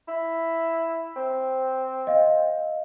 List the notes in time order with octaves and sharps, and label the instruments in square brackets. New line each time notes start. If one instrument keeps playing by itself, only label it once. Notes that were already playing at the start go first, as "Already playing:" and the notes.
[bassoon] E4
C4
[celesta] D#5 F5